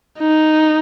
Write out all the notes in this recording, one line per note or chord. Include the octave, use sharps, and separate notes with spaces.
D#4